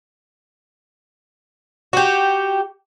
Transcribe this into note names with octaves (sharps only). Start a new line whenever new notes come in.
F#4 G4